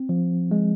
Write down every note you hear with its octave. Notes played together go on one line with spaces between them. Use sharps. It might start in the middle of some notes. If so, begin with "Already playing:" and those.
Already playing: C4
F3
G#3